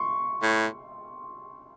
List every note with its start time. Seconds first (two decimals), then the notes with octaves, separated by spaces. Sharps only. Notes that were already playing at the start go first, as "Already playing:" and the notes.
Already playing: C6 C#6
0.42 A2